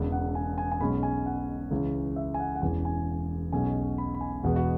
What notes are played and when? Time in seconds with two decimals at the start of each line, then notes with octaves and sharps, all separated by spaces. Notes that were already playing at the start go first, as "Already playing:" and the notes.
Already playing: E1 E2 C#3
0.12 F#5
0.35 G#5
0.58 G#5
0.72 G#5
0.80 B1 B2 G#3 C#4 B5
1.03 G#5
1.26 F#5
1.71 C#2 C#3 E3 C#4
2.16 E5
2.34 G#5
2.39 F#5
2.56 F#5
2.62 E1 E2 E3 C#4 G#5
2.85 G#5
3.53 B1 B2 G#3 C#4 G#5
3.98 B5
4.14 B5
4.21 G#5
4.43 E1 E2 B2 G#3 B3 F#4
4.56 F#4